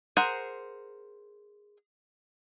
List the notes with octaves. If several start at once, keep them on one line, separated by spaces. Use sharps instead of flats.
G#4 A#4 C5 F#5